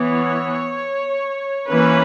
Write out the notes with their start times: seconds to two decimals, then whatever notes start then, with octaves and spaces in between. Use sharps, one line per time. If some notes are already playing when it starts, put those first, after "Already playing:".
Already playing: E3 B3 C#5
1.69 E3 A#3 C#4 B4